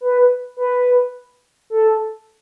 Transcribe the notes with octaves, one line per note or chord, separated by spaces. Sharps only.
B4
B4
A4